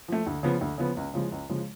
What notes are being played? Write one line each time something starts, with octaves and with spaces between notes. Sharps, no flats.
F3 A3
D2
C#3 F3 B3
D2
C#3 F3 B3
C#2
C#3 F3 G#3
C#2
C#3 F3 G#3